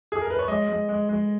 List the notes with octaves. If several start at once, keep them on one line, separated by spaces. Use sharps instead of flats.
G#4
A#4
B4
C#5
G#3 D#5
G#3
G#3
G#3